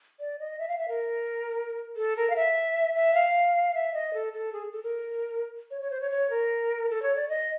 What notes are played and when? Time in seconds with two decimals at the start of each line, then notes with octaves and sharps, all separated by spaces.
0.20 D5
0.39 D#5
0.59 E5
0.68 F5
0.79 E5
0.88 A#4
1.96 A4
2.17 A#4
2.30 F5
2.36 E5
2.95 E5
3.15 F5
3.74 E5
3.94 D#5
4.14 A4
4.33 A4
4.53 G#4
4.72 A4
4.83 A#4
5.71 C#5
5.81 C#5
5.91 C5
6.01 C#5
6.11 C#5
6.30 A#4
6.90 A4
7.03 C#5
7.16 D5
7.29 D#5